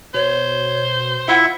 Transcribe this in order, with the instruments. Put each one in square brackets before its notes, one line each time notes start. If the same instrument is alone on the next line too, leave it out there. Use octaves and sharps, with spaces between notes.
[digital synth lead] B2 [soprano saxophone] C5 [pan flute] C#5
[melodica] E4 E5 [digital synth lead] F4 [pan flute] F#5